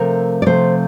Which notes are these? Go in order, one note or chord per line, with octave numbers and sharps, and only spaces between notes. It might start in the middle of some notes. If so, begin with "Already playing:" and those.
Already playing: C3 F3 A3 A#4
D5
C3 F3 A3 C5